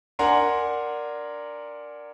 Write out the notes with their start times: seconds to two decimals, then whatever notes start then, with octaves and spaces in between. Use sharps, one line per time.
0.19 D4 A#4 F#5 G#5 A#5 C6